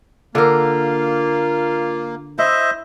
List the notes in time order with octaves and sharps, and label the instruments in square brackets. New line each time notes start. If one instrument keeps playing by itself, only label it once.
[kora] D3 A#4 [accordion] A#3 [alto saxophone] F4
[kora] E4 [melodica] C5 D#5 E5